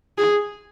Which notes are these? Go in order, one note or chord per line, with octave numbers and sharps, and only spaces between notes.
G#4